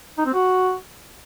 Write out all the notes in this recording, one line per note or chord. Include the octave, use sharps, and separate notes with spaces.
D#4
C4
F#4